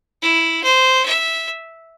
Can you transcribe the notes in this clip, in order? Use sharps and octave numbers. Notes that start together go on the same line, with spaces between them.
E4
C5
E5